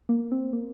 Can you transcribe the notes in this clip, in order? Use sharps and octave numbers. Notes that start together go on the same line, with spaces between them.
A#3
C4
A#3